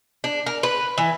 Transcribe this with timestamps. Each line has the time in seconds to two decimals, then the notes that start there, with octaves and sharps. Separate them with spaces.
0.24 D4
0.46 A#4
0.63 B4
0.98 E3